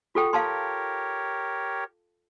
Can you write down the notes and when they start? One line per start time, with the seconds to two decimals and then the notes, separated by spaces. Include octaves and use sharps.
0.15 F4 F#4 A4 G5
0.33 G4 A#4 C#5 F5 A5 C6